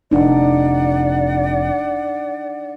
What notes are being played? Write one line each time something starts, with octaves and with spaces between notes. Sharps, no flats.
F1 D4 D#4 D5 F#5